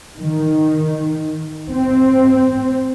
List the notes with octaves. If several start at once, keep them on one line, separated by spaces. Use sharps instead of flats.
D#3
C4